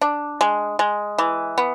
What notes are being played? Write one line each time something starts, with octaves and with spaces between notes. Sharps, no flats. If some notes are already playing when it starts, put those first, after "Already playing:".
D4
G#3
G#3
E3
B3